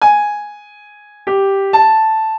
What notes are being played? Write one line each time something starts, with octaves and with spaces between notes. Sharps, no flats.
G#5
G4
A5